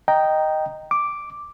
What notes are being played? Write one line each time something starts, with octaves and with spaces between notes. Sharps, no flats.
D#5 G5 A#5
D6